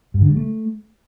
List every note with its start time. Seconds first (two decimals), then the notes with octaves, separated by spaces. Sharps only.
0.14 G2
0.22 D3
0.29 G3
0.36 A3